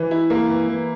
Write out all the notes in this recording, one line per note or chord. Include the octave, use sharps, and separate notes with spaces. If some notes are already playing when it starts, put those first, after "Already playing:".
Already playing: E3
E4
A#3
E3
E3